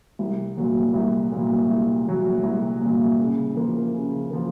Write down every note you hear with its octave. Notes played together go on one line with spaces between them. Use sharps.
C2
A#2 F#3
C2
A#2 F#3
C2
A#2 F#3
C2
A#2 F#3
C#3
F3 A#3
C#3
F3 A#3